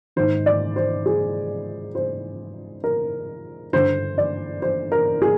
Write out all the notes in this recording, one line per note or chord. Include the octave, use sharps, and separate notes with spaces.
G#2 D#3 C5
D5
C5
G#4
C5
A#4
G2 D3 C5
D5
C5
A#4
G#4